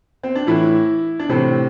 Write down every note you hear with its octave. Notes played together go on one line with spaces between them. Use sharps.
C4
D4
A2 E3 E4
D4
A2 C3 E3 C4